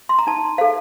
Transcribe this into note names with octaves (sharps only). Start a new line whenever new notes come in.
C6
A#5
D#4 A5
A4 C5 F5